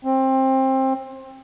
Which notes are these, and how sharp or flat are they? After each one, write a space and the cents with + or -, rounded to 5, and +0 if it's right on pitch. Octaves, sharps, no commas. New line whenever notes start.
C4 +20